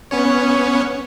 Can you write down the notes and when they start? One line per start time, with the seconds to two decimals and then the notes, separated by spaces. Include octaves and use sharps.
0.11 B3 C#4 C#5